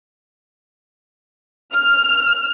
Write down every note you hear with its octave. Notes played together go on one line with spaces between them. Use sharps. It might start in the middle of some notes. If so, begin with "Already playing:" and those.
F6